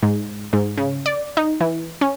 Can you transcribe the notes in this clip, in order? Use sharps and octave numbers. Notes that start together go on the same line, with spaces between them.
G#2
G#2
C#3
D5
D#4
E3
C#4